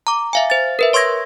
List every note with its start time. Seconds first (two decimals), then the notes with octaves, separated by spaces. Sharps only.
0.07 A#5 D6
0.33 E5 F5 G#5
0.50 C5 A6
0.79 A#4 B4 E5
0.93 C#5 C6 C#6 E6 G#6 A#6